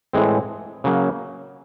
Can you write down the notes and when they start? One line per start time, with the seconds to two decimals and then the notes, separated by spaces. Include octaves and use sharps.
0.13 A2 E3 G#3 C4
0.84 C#3 F#3 A#3